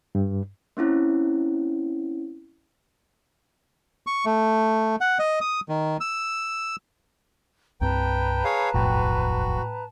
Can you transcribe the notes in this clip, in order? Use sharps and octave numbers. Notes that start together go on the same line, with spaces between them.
G2
A#3 C4 C#4 E4
C#6
A3
F#5
D#5
D#6
D#3
E6
C2 G2 C4 B4 G5 A5 A#5
G#4 C#5 F5
D#1 B1 F2 A2 F#4 G5